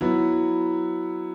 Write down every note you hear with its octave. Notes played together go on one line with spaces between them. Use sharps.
F#3 B3 E4